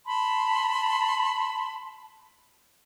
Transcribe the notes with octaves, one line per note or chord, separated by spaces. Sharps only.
A5 B5 C6